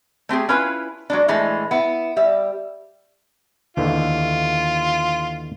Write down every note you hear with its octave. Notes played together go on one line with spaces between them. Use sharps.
A3 C4 G4 G#4
C#4 E4 F4 B4
F#3 G#3 D4
A2 E3 G#3 A3
B3 E4
G3 E5
D#2 D3 E3 F4